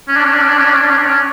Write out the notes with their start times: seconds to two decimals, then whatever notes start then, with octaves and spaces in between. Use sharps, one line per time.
0.08 C#4
0.17 D4
0.25 C#4
0.33 D4
0.41 C#4
0.49 D4
0.58 C#4
0.65 D4
0.73 C#4
0.81 D4
0.90 C#4
0.98 D4
1.06 C#4